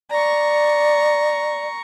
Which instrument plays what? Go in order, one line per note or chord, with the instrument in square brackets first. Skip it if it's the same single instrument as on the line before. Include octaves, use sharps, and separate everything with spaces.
[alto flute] D5 [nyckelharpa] A#5 C#6